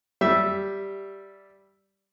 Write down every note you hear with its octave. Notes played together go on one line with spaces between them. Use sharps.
G3 G4 E5